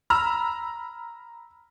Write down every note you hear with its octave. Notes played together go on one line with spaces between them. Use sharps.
A#5 B5 E6 F6